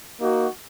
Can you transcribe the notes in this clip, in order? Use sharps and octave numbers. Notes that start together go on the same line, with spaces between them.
A#3 D#4 F#4